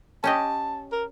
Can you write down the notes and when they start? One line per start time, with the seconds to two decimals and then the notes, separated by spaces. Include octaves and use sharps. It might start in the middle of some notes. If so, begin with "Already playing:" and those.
0.24 C#4 G4 D#5 A5
0.93 A#4